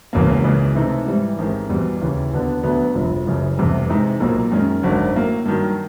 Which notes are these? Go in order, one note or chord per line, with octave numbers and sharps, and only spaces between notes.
E1 E2 C#3 F#3 A#3
C#2 C#3 E3
C3 E3 A3 C4 D#4
G#2 E3 G3
A1 G#2 D#3 G#3 C4
E2 B2 G3
D#2 C#3 E3
D#2 D3 F#3 B3 D4
D2 D3 F#3 B3
G1 F2 C3 F3
F#1 F#2 C#3 E3
F1 E2 C3 E3 G3
C3 E3 G#3 C4 D#4
B1 A#2 F#3 A#3
F#2 D#3 G#3 C#4
G#1 F#2 D3 F#3
A2 F#3 A#3
G2 D#3 F#3